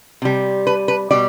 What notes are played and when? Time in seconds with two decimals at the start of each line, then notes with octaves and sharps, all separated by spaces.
0.22 C3 G3
0.67 B4
0.88 B4
1.11 B2 G3 D5